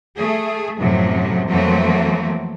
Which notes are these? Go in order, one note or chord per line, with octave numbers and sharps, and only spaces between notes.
A3 G#4
F#2 A2 C3 F3 F#3
F2 E3 F#3 A3 A#3 C4